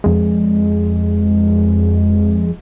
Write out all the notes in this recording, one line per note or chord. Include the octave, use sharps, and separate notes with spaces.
F2 G#3